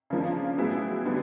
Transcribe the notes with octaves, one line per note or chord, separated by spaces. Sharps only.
C#3 F3 A#3 D4
A2 F#3 B3 E4 G#4
D3 G3 B3